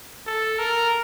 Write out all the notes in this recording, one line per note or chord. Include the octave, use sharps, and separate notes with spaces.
A4
A#4